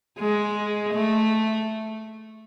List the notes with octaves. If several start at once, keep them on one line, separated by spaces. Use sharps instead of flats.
G#3
A3